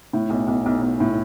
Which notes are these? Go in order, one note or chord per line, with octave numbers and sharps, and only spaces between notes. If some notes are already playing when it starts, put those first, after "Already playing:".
A2
B1
B1
B1
B1
A2